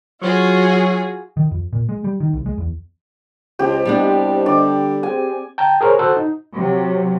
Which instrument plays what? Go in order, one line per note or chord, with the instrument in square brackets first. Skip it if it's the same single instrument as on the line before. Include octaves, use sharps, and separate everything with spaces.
[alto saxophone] F#3 [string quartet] F4 F#4 G#4
[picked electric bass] D#3
F2
A#2
G#3
G3
D#3
C2
G#3
E2
[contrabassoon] C#2 [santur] G4 [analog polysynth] C5 D#5 A5
[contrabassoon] C2 [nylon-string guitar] G3 B3 D4
[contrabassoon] D3 [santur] D5
[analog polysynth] C4 G4 G#4 [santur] G#5
[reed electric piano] G5 A5 A#5
G#4 A#4 C5 C#5
F#4 A4 C5 F#5 A5
D#4
[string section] C3 F#3